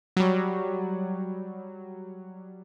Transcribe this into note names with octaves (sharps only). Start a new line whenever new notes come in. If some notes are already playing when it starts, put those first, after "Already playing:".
F#3 G3